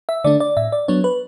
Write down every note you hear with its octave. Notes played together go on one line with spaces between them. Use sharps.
E5
D3 A3 D4 D5
D5
A2 E5
D5
F#3 B3 D4 C#5
B4